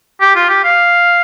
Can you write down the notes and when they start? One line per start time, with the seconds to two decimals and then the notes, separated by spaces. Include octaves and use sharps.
0.21 G4
0.36 F4
0.49 G4
0.64 F5